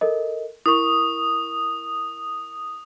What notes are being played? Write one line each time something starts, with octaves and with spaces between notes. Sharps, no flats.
A4 A#4 D#5
E4 A#4 C#6 D#6